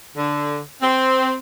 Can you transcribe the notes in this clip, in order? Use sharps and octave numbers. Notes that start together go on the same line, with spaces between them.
D3
C4